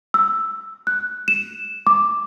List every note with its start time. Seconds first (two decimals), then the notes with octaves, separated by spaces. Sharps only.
0.14 E6
0.87 F#6
1.28 E7
1.87 D6